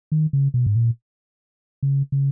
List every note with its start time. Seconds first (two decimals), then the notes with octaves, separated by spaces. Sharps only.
0.12 D#3
0.33 C#3
0.54 B2
0.66 G#2
0.76 A#2
1.83 C#3
2.12 C#3